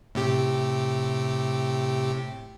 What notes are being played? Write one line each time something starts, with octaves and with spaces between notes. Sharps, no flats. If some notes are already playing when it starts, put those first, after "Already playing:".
A2 C3 G4